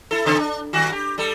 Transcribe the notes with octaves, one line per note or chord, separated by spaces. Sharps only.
E4 A4
C#3 C4 A4
D4
G2 D#3 F#4
G4
G3 A4